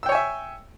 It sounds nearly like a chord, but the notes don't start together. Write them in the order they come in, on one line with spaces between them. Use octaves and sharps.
E6 G5 C#5 G#5 E5